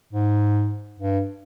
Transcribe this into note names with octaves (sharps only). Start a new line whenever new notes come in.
G#2
G2